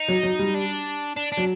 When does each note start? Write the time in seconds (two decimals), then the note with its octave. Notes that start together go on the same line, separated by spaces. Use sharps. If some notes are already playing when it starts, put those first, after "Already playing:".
Already playing: D#4
0.08 F#3
0.23 F#3
0.39 G3
0.54 D4
1.16 D4
1.32 D4
1.37 F#3